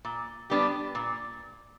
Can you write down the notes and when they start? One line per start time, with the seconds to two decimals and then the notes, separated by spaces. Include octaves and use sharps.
0.05 A#2
0.50 G3 B3 D4 G4
0.95 A#2